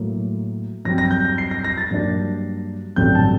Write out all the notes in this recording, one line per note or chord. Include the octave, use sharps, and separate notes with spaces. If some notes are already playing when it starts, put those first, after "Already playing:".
Already playing: A2 F#3 A#3
G2 F#3 C4 A#6
A#6
G6
A#6
C7
A#6
A#6
A6
G2 F#3 A#3 D4
A1 G2 D3 F#3 C4 G6
A5